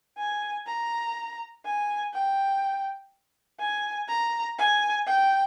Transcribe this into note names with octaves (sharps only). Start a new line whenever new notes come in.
G#5
A#5
G#5
G5
G#5
A#5
G#5
G5